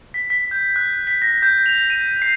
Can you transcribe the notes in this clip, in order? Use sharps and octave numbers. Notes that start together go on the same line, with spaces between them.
B6
B6
G6
F#6
B6
A#6
G6
F7
D#7
C7